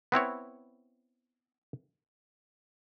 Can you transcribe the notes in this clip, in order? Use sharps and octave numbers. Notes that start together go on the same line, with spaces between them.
B3 C4 E4 C#5